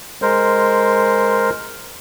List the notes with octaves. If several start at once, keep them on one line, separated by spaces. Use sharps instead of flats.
G#3 A#4 C5